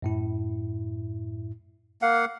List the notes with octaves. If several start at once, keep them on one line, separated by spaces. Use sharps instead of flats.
F#2 A2 E4
A#3 F5 F#5